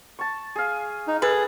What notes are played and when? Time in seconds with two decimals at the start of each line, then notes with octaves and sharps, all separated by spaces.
0.19 A5 C#6
0.56 G#4 F5
1.07 D#4
1.22 G#4 A4 B4